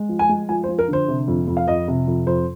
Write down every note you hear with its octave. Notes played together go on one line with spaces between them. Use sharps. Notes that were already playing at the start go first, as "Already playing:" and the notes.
Already playing: G#3
F3
G#5
G#3
F3 G#5
C5
F3
A#4
D3 C5
C3
F2
F2
F5
F2 D#5
C3
F2
F2 C5